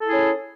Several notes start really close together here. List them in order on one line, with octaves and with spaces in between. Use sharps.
A4 E4 G#4 C#4